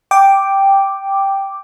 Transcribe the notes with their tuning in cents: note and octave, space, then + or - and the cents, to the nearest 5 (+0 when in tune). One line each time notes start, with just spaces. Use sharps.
G5 +0 D6 +0